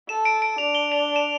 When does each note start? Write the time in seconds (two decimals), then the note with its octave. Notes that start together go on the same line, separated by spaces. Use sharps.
0.09 A4 E7
0.25 D7
0.42 D7
0.58 D4 F7
0.75 G7
0.92 F7
1.16 E7